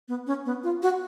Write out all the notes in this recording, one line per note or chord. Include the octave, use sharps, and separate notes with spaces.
B3
C#4
B3
F4
F#4